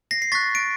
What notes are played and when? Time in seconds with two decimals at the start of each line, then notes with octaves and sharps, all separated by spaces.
0.11 A#6 C7
0.22 C7
0.32 C#6 F#6 A6 B6
0.55 D7